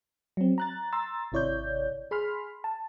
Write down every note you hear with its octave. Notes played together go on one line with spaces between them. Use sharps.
F#3 C4
A#5 F#6 A6
A#5 C6 E6 A6
G#1 C3 E4 C#5 D5 G6
G#4 B5 C6 F6
A5